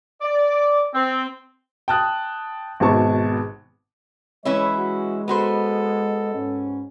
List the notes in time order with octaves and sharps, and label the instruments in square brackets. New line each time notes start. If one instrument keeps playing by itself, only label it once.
[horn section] D5
C4
[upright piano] G5 A5 D#6 F#6
G#1 B2 D#3 G#3 A5 C#6
[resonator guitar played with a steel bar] E3 C#4 E4 [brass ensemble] G#3 D#5 [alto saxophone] C#5
[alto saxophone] F#4
[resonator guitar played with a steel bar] B3 F#4 C5 [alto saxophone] A4
[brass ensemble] G#2 C#4